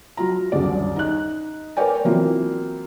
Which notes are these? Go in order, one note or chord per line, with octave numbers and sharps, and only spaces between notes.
F#3 F4 A#5
D#1 C2 F#2 D3 G#4 D5
D#4 F#6
A#4 B4 C#5 D5 G5 G#5
E3 F#3 A#3 C4 E4 F4